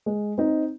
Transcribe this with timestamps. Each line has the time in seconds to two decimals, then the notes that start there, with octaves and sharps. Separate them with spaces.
0.06 G#3
0.38 C4 D#4